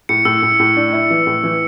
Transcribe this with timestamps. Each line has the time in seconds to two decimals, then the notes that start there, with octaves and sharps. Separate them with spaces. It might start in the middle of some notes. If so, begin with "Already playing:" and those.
0.09 A2 C#7
0.25 A2 E6
0.42 A2
0.60 A2
0.77 D4
0.93 E4
1.10 E3
1.27 A2
1.44 E3